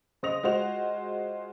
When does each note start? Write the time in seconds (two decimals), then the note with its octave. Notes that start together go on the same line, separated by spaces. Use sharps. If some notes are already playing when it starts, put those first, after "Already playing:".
0.23 C#3 C5 D#5 D#6 A#6 F7
0.43 G#3 F4 F#4 C5 F7